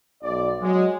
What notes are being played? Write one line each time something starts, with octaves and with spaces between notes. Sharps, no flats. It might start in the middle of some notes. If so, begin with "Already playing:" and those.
B1 D5
F#3 G#3